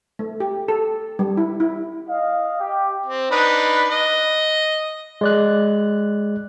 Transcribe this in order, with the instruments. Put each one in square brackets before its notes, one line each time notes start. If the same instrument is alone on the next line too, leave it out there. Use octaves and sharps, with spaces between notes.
[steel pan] A3
G4
A4
G3
E4
E4
[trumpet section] D#5 F5
G4
[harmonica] C4
D4 D#4 B4
D#5
[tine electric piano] G#3 D5 F#6